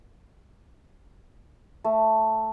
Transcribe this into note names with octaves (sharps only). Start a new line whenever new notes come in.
A3